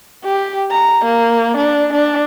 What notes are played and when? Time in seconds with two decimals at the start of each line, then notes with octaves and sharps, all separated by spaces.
0.25 G4
0.72 A#5
1.05 A#3
1.58 D4
1.94 D4